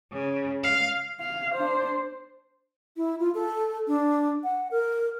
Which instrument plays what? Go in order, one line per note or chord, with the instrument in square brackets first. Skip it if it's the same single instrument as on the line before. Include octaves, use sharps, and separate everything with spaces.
[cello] C#3
F5
[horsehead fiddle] F5
D4 C5
[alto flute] E4
F4
A4
D4
F#5
A#4